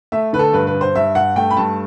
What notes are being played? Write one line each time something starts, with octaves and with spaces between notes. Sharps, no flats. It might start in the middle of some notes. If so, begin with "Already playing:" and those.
A3 E5
D3 B4
A4
G2 B4
B4
G2
C5
G2 E5
G2 F#5
A3 G5
B5
G2 A5